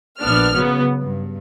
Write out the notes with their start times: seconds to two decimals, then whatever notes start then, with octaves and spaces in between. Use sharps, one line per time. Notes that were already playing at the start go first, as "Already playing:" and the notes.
0.21 A#1 B3 D4 F6
0.54 C#3 F#3 B3
1.02 G2